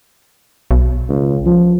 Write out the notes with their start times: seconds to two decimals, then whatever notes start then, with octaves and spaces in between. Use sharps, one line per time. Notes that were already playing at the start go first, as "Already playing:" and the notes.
0.71 B1
1.09 C#2
1.46 F3